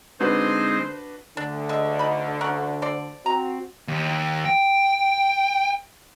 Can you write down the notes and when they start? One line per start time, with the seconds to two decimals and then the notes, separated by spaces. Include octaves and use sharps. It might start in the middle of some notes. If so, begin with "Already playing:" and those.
0.21 D3 G#3 C4 D4 D#4 F#4 B4 C5
1.37 D2 D3 D4
1.69 G#3 E5
1.99 D#4 B5
2.41 C#4 A#4 F#5
2.82 A4 C5 D5
3.26 C4 F#4 A#5
3.88 D#2
4.45 G5